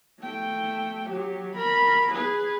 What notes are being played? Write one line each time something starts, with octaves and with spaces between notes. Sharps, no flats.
A3 G5
F#3 G4
A#4 B5
G#4 B4